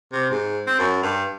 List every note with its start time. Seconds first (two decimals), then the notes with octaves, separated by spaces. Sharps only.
0.12 C3
0.30 G#2
0.67 C4
0.79 F#2
1.03 G2